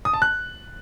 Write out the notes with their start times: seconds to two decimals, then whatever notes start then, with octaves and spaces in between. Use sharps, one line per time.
0.05 D#6
0.13 A5
0.22 F#6